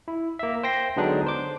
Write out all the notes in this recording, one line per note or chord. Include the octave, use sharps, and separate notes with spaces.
E4
A#3 E5
C5 G5 A#6 C7
D3 F#3 G#3 B3 D4 D#4
C5 D6